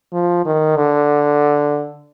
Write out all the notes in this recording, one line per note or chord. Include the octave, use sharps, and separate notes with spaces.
F3
D#3
D3